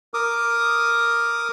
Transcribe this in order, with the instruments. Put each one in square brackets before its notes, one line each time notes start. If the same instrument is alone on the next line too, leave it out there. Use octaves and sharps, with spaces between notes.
[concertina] A#4 D6 D#6